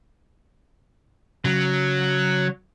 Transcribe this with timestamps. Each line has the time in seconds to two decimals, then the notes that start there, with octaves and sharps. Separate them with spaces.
1.45 C#3 F#3